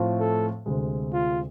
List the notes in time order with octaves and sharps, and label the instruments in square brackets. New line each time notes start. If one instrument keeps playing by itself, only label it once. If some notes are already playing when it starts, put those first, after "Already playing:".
Already playing: [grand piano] A2 F3 A3 C4 F4
[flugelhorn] A4
[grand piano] D2 C3 G#3 C4
[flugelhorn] F4